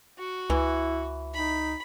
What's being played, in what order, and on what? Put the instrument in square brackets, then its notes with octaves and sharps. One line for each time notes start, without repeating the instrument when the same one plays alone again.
[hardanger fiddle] F#4
[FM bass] C#2 [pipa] E3 [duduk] E4
[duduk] D#4 [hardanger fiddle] B5